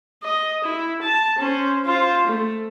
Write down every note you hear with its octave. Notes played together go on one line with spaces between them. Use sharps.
D#5
E4
A5
C#4 C5
F4 C5
A3